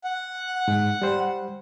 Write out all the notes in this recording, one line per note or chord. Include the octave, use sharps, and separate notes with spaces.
F#5
G#2
G3 C5